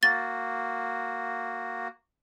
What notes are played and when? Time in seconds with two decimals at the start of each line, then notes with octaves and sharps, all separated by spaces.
0.03 A#3 F#4 A6